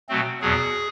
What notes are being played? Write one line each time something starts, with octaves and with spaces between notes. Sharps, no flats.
B2 F#3 A3 C4
E2 B2 F#3 G#4